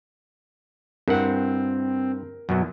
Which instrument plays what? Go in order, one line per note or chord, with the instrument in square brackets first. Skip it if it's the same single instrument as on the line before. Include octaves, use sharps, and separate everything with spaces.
[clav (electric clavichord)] G2 E4 F#5 [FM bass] C4 [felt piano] A#4
[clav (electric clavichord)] F#2 B2 F#3